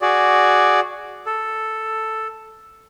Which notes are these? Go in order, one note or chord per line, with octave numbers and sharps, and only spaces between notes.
F#4 G#4 D5
A4